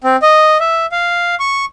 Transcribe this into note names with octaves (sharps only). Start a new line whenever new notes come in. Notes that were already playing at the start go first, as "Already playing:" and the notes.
C4
D#5
E5
F5
C#6